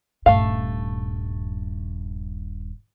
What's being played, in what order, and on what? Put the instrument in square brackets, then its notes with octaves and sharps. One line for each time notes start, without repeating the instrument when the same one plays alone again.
[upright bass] D#1 G2 [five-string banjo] A3 F5